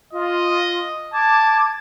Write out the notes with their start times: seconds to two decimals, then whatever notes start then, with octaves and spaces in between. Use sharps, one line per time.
0.13 F4 D#5
1.13 A5 D6 G#6